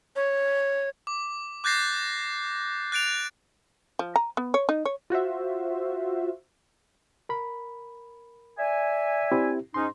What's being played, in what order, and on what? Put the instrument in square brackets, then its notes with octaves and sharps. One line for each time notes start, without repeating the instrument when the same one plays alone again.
[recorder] C#5
[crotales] D6
D6 F#6 G6 A6 A#6 C7
F#6 A6 D7 F7
[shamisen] F3
A#5
B3
C#5
D#4
C#5
[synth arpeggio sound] F4 F#4 C5 E5
[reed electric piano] A#4 B5
[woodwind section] D5 E5 G#5
[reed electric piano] C4 E4 G4
[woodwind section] G#2 C#4 D#4 [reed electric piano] C6